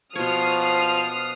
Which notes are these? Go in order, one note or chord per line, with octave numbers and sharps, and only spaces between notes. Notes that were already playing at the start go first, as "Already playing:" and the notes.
B2 F3 C#5 D#6 F6 C7